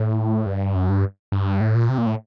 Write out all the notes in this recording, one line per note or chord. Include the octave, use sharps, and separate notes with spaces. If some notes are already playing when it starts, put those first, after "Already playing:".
Already playing: A2
G2
F#2
G2
G2
A2
A#2
C3
A#2
A2